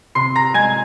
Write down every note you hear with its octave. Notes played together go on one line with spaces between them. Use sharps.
C3 C6 C7
A#5 A#6
G#3 G#5 G#6